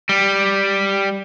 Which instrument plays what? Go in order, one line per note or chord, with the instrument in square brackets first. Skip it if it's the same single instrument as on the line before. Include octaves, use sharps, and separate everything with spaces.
[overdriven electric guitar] G3